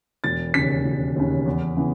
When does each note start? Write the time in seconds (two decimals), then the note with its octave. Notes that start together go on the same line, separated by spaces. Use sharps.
0.24 E1 A6
0.54 D#2 C#3 B6
0.85 E1
1.16 D#2 C#3
1.46 E2
1.77 C#3 E3 B3